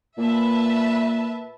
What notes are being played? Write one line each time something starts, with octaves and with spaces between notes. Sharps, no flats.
A#2 B4 E5 A5